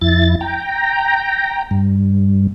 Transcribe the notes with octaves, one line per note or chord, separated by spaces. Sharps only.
F2 E4 A6
G5 A#5
G2